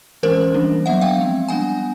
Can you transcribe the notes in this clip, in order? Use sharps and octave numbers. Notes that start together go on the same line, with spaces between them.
E3 G#3 C#4 A#4 C5
E3 G3 A#3 D4
F#3 B3 D4 E5 F#5
F5 G5
F3 G#3 C4
G3 B3 D4 F#5 G#5